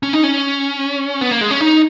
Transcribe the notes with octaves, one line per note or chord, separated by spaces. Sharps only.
C#4
D#4
C#4
B3
A#3
G#3
C#4
D#4